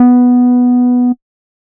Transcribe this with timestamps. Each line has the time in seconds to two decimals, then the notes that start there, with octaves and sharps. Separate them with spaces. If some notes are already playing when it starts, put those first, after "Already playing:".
Already playing: B3